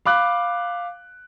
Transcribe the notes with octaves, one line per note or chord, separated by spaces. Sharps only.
F5 B5 D6 F#6